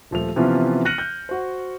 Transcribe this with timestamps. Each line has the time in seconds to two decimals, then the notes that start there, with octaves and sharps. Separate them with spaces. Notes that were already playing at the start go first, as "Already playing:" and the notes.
0.11 D#1 F3 A3 F7
0.36 C3 E3 F3 B3 C#4 F4
0.85 F6 F#6 A#6 C#7 D#7 F#7
0.98 G6
1.29 F#4 C5